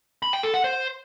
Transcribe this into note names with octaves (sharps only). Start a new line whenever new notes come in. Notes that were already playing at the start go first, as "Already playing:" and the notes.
B5
G5
A4
F#5
C5